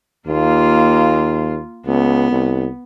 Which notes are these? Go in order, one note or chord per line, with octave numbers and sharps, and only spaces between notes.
D#2 A#3 F4
C#2 B3
C2